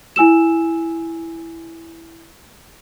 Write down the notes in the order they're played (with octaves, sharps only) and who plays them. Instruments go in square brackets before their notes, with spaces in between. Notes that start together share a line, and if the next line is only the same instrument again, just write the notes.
[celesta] E4 G#5 E6 E7